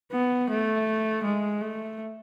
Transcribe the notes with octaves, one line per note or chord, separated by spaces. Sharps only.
B3
A3
G#3
A3